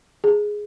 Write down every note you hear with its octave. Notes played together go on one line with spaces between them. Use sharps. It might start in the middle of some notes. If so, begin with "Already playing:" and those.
G#4